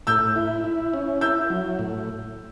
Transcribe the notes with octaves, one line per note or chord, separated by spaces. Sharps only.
A2 E6 G6
E4
E4
C#4
E4 E6 G6
F#3
A2